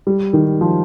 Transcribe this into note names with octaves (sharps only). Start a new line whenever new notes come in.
G3
D#3
F3